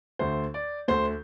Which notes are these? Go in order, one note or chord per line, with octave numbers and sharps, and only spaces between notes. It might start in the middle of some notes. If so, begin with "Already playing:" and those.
D2 D3 A3 C5
D5
D2 D3 A3 C5